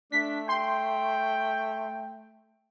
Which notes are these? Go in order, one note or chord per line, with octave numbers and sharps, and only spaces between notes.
A3 D4 B6
G5 C6